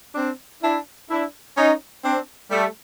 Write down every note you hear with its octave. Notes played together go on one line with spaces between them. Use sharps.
C4 D4
D4 E4
D4 E4
C#4 D#4
C4 D4
G3 A3